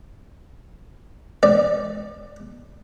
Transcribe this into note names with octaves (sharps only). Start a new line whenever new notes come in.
D5